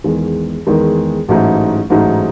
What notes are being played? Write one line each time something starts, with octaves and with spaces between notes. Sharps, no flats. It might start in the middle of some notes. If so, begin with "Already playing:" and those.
E2 D#3 G#3
E2 D#3 G#3
A1 G#2 F#3 A3 D#4
A1 G#2 F#3 A3 D#4